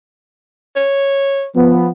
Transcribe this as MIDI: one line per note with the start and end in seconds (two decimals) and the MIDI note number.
0.76 1.46 73
1.56 1.91 53
1.56 1.91 59